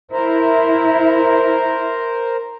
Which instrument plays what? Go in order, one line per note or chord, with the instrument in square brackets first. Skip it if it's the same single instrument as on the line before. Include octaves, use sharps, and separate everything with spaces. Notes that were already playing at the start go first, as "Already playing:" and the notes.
[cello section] E4 [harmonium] A#4 C5